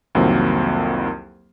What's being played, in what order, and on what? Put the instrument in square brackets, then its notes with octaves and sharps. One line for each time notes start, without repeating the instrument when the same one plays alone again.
[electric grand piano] C2 F2 D#3 F#3 A#3 C4